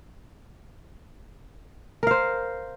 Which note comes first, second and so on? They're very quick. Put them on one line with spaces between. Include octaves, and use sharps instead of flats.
A#4 F5 C5